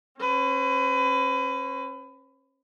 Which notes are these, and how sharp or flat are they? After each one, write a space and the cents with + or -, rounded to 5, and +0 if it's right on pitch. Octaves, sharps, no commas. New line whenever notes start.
C#4 -35 B4 +30